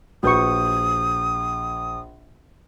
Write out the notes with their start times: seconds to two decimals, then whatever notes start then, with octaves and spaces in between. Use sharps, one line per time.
0.23 A#1 F#4 B4 C#6 D#6 G6